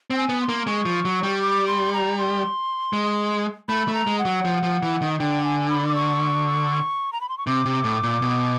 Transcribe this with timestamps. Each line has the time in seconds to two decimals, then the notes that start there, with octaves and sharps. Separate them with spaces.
0.10 C4 G5
0.17 G#5
0.29 B3
0.41 C6
0.49 A#3
0.67 G#3 C#6
0.85 F3
1.05 F#3
1.23 G3
1.42 D6
1.67 C6
1.93 A#5
2.18 C6
2.93 G#3
3.68 A3 B5
3.88 A3
3.94 A#5
4.07 G#3
4.19 F#5
4.25 F#3
4.45 F3
4.63 F3
4.83 E3
5.02 D#3
5.20 D3 G5
5.44 G#5
5.70 B5
5.87 D6
5.95 C#6
7.13 A#5
7.21 B5
7.29 C6
7.38 C#6
7.47 C3 D6
7.66 C3
7.84 A2
8.03 A#2
8.22 B2